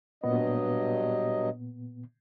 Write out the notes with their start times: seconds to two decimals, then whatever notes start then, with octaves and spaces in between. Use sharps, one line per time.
0.24 G2 A#2 F#3 B3 D#5